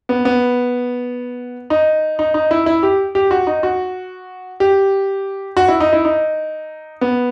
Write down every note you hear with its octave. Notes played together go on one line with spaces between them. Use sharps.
B3
B3
D#4
D#4
D#4
E4
E4
G4
G4
F#4
D#4
F#4
G4
F#4
E4
D#4
E4
D#4
B3